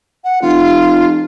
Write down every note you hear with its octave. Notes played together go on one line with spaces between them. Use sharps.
F#5
F1 F4